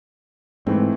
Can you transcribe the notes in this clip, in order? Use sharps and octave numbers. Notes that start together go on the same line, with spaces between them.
G#2 E3 A3 C4